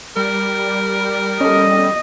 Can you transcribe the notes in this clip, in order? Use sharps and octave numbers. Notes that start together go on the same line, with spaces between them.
G3 A#4
C#4 A4 D#5